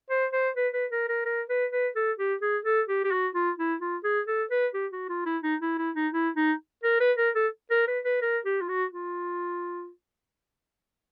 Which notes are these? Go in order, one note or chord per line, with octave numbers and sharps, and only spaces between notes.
C5
C5
B4
B4
A#4
A#4
A#4
B4
B4
A4
G4
G#4
A4
G4
G4
F#4
F4
E4
F4
G#4
A4
B4
G4
F#4
F4
E4
D#4
E4
E4
D#4
E4
D#4
A#4
B4
A#4
A4
A#4
B4
B4
A#4
G4
F4
F#4
F4